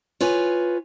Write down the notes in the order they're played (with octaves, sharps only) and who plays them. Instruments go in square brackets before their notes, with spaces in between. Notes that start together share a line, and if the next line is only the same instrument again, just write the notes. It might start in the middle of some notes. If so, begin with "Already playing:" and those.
[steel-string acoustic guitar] F4 B4 C#5 G#5